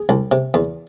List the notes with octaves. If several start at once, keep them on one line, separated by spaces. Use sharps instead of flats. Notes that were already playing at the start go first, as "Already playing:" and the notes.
Already playing: G#4
C2
C3
E2